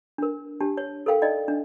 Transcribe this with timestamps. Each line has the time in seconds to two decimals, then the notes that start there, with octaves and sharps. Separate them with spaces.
0.18 D4 A#4
0.60 D4 G4 A5
0.77 C#5
1.06 A4 A#4 F5 G5
1.22 D#4 D5 D#5 G5
1.48 D4